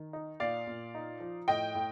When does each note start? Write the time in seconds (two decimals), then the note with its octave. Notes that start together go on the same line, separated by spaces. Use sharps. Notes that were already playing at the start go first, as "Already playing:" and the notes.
Already playing: D#3
0.13 D#4
0.40 A#2 D5 F5
0.67 A#2
0.95 D#4
1.20 F3
1.48 A2 D#5 G5
1.75 A2